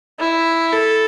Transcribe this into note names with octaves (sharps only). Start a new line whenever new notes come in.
E4
A4